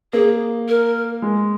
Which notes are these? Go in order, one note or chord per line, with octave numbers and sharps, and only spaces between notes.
A#3 G#4
A#4
G#3